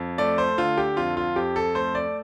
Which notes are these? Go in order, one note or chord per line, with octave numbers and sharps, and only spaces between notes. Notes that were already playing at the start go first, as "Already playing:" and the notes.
Already playing: F2
A3 D5
C5
D3 F4
G4
F2 F4
F4
F2 G4
A4
A3 C5
D5